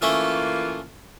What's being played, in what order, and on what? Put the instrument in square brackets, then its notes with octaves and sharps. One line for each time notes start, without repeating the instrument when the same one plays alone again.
[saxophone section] E3 A#3 F4 [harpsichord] A3 C#4 E5